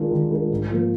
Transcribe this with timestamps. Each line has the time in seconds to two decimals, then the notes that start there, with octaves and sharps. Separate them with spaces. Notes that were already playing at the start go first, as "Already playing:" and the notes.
Already playing: D#3 G#3 D4 F4 A#4
0.11 D#3
0.31 G#3 D4 F4 A#4
0.51 G#2
0.70 F3 A#3